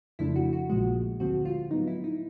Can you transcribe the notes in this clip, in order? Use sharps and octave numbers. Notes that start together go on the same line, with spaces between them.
F2 C#3 F3 A3 D4 E4
F#4
F#4
A#1 A#2 F3 G#3 F#4
D2 D3 F3 G#3 C4 F#4
F4
A2 F#3 B3 D#4
E4
D#4